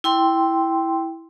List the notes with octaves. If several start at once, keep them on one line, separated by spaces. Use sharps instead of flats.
E4 G5 C6